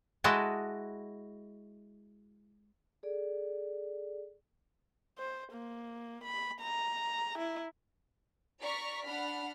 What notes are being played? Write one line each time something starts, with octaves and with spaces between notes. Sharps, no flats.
G#3 E4 F#4 D#5 A5
G#4 A4 D5
C5
A#3
B5
A#5
E4
D5 A#5 C#6 F6 B6
D4 F#5 B5 F6